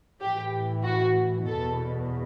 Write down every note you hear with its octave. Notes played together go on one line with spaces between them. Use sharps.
A2 E3 G4
F#4
E2 B2 A4